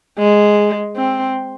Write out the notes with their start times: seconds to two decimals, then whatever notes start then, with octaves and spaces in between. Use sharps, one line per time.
0.18 G#3
0.97 C4